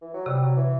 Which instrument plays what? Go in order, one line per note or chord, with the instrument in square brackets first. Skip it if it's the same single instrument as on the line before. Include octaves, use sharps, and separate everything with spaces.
[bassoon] E3
F#3
[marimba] C3 [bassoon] G3
[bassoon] F#3
E3